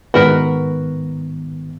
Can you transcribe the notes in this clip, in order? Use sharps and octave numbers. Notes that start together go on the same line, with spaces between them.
G#2 D#3 B3 F#4 A#4 B4